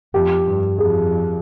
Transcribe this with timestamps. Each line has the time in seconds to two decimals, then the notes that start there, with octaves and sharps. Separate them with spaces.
0.14 F2 G4
0.46 G2
0.78 F2 G#4